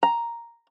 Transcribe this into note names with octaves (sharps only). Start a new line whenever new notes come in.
A#5